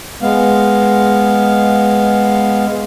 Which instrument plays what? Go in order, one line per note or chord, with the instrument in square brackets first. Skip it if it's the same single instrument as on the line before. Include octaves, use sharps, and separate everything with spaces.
[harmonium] G#3 B3 F5